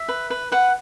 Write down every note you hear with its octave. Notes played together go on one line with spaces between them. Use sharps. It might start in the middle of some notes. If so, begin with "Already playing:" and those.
Already playing: E5
B4
B4
B4 F#5